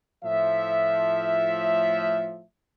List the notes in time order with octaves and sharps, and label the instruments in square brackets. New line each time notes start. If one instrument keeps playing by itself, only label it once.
[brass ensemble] A2 F3 E5